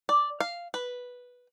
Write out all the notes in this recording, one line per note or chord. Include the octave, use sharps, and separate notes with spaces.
D5
F5
B4